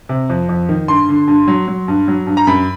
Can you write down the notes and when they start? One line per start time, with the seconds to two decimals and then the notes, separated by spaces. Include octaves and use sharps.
0.09 C3
0.30 F2
0.49 F2
0.69 D#3
0.88 G2 C6
1.09 D3
1.28 G2
1.48 F#3
1.68 F#3
1.88 G2
2.08 F#3
2.27 G2
2.37 A#5
2.47 F#2 B5